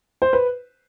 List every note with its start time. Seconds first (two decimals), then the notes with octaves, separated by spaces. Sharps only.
0.22 C5
0.33 B4